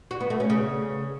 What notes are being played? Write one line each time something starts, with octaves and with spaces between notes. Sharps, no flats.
F#4
B3
A3
C#4
C#3